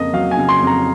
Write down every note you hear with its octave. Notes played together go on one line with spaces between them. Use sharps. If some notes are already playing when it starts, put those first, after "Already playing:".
Already playing: F2 C#3 A#3 D#5
F#3 F5
G#5
C#3
C6
F2
A#5